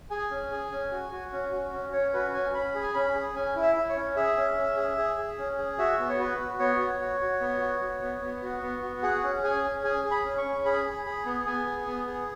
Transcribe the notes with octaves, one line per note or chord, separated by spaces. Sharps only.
G#4 G#5
C#4
G#4
C#4
F#4
F#4
C#4
F#4
C#4
C#4 C#5
F#4 B4
C#4 G#5
C#4 B5
G#4
G#5
C#4 B5
G#4
C#4 G#5
E4
E5
E4
C#5
C#4
G#4 E5
C#4
C#4
G#4
G#4
G#4
C#4
G#4
F#4 E5
B3
C#5
F#4 B4
F#4
B3 C#5
F#4
F#4
F#4
B3
F#4
F#4
B3
B3
F#4
B3
F#4
G#4 F#5
C#4
G#4 G#5
C#4
G#4 G#5
G#4
B5
C#4
C#6
C#4
G#4 B5
G#4
G#4
B3
B3 G#5
G#4
B3
G#4